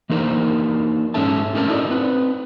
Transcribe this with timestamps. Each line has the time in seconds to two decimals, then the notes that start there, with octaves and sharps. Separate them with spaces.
0.10 E3 A#3 D4 D#4 A#4 C5
1.14 G#2 C#4 A4 E5 A5
1.53 A2 C4 C#4 A4 A#4 A5
1.68 D#4 E4 F#4 D5
1.90 C4 B4